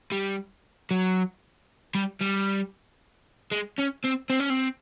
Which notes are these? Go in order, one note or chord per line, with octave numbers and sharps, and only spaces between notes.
G3
F#3
G3
G3
G#3
C#4
C4
C4
C#4
C4